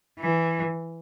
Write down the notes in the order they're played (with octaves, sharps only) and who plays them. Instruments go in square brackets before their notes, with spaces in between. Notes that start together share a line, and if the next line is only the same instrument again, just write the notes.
[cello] E3